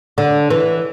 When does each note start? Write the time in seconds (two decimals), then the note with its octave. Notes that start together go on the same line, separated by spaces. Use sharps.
0.18 D3
0.50 E3